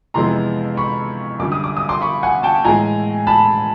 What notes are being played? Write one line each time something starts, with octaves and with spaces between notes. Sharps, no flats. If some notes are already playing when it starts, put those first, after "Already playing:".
F2 C3 E3 G#3 B3 A#5 C6
B5 C#6
F#2 D3 G3 D6
D#6
D6
D#6
C6 D6
B5 C#6
F#5 G#5
G5 A5
A2 E3 G#3 G#5 A#5
A5 B5